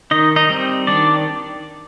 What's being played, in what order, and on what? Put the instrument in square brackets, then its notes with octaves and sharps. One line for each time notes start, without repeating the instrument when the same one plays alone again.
[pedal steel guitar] D#3 D#4 D#5
D#4 D#5
G3 C4
D#3 D4 D5